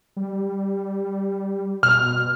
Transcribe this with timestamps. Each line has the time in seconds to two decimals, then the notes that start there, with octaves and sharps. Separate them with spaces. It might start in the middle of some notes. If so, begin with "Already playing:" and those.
0.16 G3
1.83 B2 F6